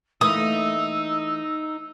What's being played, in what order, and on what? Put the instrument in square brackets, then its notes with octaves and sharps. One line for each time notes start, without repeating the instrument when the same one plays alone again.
[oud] E3 A3 A#3 [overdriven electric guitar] D#4 [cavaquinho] D#6 [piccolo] E6